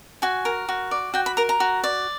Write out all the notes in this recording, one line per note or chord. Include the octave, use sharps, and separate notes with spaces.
F#4 G#5
A#4
F#4
D5
F#4 G5
B5
A#4 A#5
A#5
F#4
D5